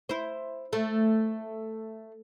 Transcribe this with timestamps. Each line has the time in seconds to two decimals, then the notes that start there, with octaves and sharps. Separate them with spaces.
0.09 E4 C5
0.73 A3